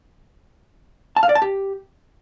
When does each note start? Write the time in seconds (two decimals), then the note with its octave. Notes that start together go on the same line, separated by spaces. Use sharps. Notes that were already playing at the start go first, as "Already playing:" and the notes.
1.16 A5
1.23 F5
1.29 D5
1.35 A5
1.42 G4